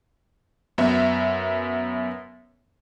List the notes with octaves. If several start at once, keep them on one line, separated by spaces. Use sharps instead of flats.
F#2 B3 E5